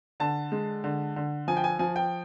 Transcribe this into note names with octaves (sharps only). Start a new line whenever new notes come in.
D3 A5
G#3
D3
D3
F3 G#5
G5
G#5
F3 G#5
G5